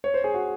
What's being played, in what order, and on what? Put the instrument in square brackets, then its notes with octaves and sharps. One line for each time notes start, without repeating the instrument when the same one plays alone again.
[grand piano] C#5
C5
G#4
F#4